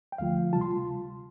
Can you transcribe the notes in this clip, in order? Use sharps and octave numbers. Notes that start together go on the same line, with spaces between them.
G5
D2 D3 F3 A3 F4 F5
C3 G3 F4 A5
C6